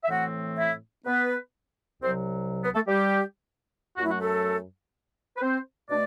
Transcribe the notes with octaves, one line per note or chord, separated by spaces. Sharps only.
E5
A2 E3 A3 C4 F#4 F#5
E4 E5
B3 B4
C2 C3 F#3 C4 C5
B3 B4
A3 A4
G3 G4
F#2 F#3 A3 F#4
E4
F#4
A3 A4
B4
C4 C5
B2 A3 D4 D5